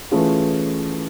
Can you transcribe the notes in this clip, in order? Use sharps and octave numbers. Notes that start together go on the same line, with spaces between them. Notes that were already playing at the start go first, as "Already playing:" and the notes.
E3 A3 C#4 F4 G#4